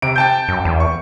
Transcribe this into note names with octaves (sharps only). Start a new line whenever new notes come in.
C3 D7
G5 A5 G6
F#2
E2
C#6